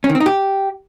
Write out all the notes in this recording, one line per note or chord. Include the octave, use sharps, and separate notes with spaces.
C#4
D#3
C4
D#4
G4